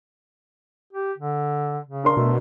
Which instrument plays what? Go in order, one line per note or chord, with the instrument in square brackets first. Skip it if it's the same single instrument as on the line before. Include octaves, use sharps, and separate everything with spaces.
[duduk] G4
D3
C#3
[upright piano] D4 A#4 C6
[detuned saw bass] B2 [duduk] A3